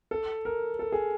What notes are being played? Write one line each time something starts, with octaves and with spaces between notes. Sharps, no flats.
A4
A#4
A4
G#4